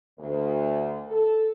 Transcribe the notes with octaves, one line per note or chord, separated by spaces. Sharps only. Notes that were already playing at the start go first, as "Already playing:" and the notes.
D2
A4